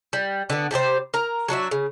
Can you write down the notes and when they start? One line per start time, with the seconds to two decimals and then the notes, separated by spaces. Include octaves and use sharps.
0.13 G3
0.50 D3 B3
0.71 C3 G3 G4 C5
1.14 A#4 A#5
1.49 F#3 D4 F#4 E5
1.71 C#3